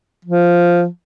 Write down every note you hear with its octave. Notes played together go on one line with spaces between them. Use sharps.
F3